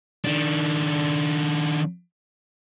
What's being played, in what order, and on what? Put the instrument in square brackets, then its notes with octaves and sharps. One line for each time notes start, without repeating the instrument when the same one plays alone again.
[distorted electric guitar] D#3 D4